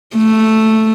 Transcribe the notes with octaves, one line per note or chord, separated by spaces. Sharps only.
A3